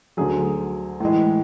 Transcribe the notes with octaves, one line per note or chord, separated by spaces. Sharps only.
D2 D3 F#3 G#4
A2 E3 G#3